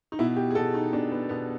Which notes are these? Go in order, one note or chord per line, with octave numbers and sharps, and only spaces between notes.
D#4
B2 E4
G4
G#4
B2 A4
D#4
B2 D4
B3
B2 B3